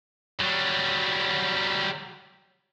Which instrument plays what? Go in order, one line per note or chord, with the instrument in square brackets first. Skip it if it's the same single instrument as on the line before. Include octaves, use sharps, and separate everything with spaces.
[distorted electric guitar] F#3 G3